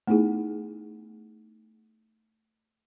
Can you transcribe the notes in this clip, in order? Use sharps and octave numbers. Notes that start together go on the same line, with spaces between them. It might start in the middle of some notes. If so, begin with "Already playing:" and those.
A3 B3 D#4 E4 G#4